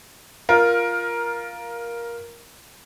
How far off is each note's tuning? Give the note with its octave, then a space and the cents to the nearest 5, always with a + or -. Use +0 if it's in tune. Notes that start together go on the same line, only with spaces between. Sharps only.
F4 +0 A#4 +10